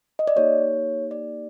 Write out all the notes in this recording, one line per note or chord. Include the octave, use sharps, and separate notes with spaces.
D#5
D5
A#3 D#4 G4 C#5
D5